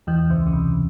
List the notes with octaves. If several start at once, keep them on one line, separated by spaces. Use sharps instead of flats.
E2 E3
C#2 C#3
C#3
C3